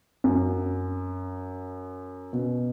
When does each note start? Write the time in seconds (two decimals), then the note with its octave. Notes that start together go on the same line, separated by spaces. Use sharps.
0.24 F#2
2.33 B2